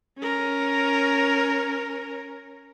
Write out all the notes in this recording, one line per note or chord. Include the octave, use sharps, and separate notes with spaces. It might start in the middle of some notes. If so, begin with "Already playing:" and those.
C#4 A#4